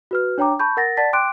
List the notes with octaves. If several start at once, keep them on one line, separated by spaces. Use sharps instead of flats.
F#4 B4 F6
D4 C#5 G5 A#5 D6
A5 B5 C#6 G6
A#4 F#5 A6 A#6
D5 F#5 A5 A6 B6
G5 C6 D6 F#6 D7